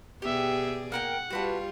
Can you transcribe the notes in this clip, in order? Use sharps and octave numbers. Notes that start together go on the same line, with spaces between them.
B2 B3 G4 G#4 D5 E5
A#3 A#4 F#5 G5
G3 F4 F#4 B4 A5